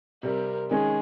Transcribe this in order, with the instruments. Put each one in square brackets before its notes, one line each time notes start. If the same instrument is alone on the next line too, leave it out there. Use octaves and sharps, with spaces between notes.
[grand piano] C3 G3 C4 [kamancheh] A#4
[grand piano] D#3 G#3 C#4 [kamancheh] G#4